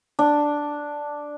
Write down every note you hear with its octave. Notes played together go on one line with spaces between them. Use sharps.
D4